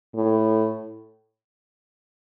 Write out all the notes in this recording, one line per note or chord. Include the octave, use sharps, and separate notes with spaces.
A2